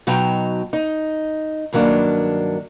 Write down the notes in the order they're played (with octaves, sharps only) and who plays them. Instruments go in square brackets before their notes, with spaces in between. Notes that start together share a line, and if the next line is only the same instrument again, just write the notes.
[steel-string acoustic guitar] B2 F#3 D#4 G5 A5 A#5
D#4
G2 D#3 F#3 A#3 D4